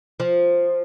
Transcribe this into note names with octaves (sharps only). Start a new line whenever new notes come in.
F3